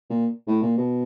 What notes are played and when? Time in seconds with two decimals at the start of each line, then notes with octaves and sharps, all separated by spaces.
0.10 A#2
0.47 A2
0.62 A#2
0.77 B2